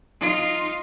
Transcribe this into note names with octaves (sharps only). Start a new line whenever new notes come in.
D#4 F4